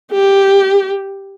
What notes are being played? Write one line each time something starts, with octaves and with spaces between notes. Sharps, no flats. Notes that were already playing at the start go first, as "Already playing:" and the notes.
G4